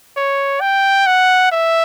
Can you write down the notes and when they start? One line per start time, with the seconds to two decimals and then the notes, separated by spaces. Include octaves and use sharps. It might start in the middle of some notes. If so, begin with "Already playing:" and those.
0.17 C#5
0.61 G5
1.07 F#5
1.52 E5